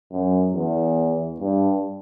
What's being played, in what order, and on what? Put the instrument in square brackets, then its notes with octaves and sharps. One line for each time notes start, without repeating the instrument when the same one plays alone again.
[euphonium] F#2
E2
G2